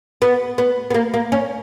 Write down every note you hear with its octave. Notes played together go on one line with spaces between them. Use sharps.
B3
B3
B3
A#3
A#3
C#4